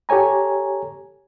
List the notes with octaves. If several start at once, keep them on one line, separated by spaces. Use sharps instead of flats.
G4 A4 C#5 G#5 A#5